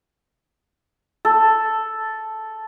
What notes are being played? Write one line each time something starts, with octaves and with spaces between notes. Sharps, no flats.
A4